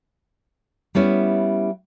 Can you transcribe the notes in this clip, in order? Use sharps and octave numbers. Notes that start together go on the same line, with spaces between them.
G3 B3 C#4 E4